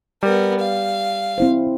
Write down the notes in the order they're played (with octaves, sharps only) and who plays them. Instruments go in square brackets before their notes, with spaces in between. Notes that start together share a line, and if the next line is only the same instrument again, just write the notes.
[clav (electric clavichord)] G3 [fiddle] B3 A#4
[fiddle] F5
[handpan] C4 E4 C5